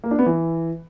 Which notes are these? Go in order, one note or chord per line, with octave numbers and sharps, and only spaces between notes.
A#3
D4
B3
E3